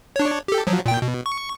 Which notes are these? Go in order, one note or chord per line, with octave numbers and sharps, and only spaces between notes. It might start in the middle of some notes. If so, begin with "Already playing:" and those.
D4 C#5
G4 A4
F3 F#3
A#2 G5
B2
C#6